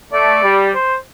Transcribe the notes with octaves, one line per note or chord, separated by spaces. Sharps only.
A3 D5
G3
C5